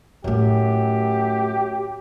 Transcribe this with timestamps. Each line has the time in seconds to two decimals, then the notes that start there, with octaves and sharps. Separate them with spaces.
0.24 F#2 A2 A3 G4